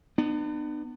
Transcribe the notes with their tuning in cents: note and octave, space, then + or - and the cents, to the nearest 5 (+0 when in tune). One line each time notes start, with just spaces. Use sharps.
B3 +15 D4 +45